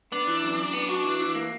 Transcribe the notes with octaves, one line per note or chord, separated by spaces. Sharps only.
B3 D4
E3
F#2
F#2
B3
F#4
E3
E3
A#3